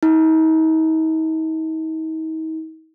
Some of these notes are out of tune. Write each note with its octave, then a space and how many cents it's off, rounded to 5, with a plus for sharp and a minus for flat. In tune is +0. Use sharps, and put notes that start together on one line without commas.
D#4 +40